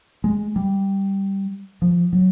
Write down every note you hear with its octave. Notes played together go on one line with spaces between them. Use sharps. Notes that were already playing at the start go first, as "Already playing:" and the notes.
G#3
G3
F3
F#3